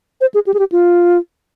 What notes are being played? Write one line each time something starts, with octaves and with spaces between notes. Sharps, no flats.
C5
G#4
G4
G#4
G4
F4